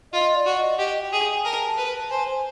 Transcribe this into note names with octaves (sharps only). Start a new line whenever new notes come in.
F4 D#5
D5
F#4
D#5
G4 D#5
G5
G#4
G5
G#5
A#4 A5
A5
B4
A5
C5 G#5
G#5